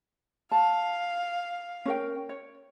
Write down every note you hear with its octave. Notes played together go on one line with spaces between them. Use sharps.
F5 A5
C#4 A#4 G5
C#5